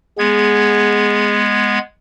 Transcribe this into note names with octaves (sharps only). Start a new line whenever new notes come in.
G#3 B3 G#4 G#6